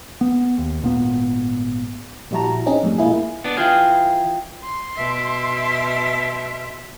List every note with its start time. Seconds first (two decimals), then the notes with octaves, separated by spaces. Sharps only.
0.21 B3
0.58 D#2
0.82 G#1 A#2 B3
2.31 A#1 G3 E4 F#4 A5 A#5
2.66 C4 C#4 D#4 G#4
2.83 F2 A2 G3
2.98 A#2 G#3 A#3 E4 G#4
3.44 B3 D4
3.57 E3 F4 G#4 F5 G5
4.63 C6
4.96 B2 E5